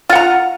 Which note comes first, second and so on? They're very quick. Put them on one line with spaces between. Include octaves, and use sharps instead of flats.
F4 F#5 A#5